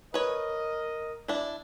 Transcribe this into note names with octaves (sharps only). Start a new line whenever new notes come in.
A#4 B4 C#5 D#5
D4 E4